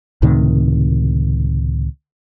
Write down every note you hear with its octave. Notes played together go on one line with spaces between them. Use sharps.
C#2 A2 C3 D#3